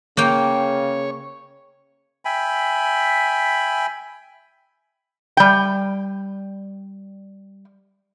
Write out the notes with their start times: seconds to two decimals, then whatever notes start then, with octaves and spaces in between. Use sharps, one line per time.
0.17 C#3 A#3 C#5 G5
2.25 E5 G5 G#5 B5
5.37 G3 G5